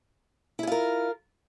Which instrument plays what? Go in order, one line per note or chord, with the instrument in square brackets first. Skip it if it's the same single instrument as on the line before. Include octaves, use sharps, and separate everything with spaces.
[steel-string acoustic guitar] E4
G#4
F4
A#4